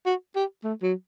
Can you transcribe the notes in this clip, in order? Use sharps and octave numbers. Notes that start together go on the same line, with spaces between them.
F#4
G4
A3
F#3